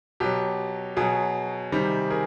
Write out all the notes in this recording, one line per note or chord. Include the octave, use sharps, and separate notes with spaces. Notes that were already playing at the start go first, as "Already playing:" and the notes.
B2 F#3 G4
B2 F#3 G#4
C3 D#3 G3
G#4 A#4